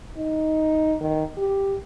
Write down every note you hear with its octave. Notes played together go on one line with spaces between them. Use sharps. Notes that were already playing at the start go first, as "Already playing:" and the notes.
D#4
D#3
G4